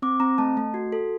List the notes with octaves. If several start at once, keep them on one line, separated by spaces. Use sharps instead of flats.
C4 D6
C4 A#5
A3 A5
A3
F#4
A4